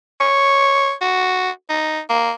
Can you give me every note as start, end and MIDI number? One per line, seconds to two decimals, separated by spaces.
0.21 0.93 73
1.01 1.50 66
1.70 2.00 63
2.09 2.32 58